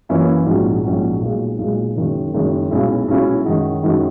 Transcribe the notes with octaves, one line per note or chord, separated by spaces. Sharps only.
F#2 E3 A#3 C#4 E4
A#1 G#2 F#3 C#4 F#4
A#1 G#2 F#3 C#4 F#4
B1 A#2 G#3
B1 A#2 G#3
F#1 F#2 D#3 G#3
F#1 F#2 D#3 G#3
B1 B2 G#3 C#4 E4
B1 B2 G#3 C#4 E4
F#2 D#3 G#3 D#4 F#4
F#2 D#3 G#3 D#4 F#4